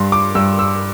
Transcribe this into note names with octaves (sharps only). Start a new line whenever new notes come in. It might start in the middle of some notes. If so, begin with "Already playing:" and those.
Already playing: G2 C6
D6
G2 E6
E6